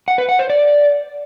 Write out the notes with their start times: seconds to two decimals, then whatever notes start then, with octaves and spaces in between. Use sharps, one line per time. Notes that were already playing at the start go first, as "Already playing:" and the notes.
0.08 F#5
0.18 B4
0.29 F#5
0.39 C5
0.50 D5